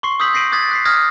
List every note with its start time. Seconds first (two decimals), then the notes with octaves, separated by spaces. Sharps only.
0.03 C6 C#6 C7
0.20 D#6 E6 G6 B6 F#7
0.33 G6 A#6 C7 D7 D#7 F#7
0.52 D6 D#6 F#6 G#6 A6 B6
0.71 F#6 B6 C7
0.85 D#6 F6 G#6 A#6